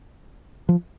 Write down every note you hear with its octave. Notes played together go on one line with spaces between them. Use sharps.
F3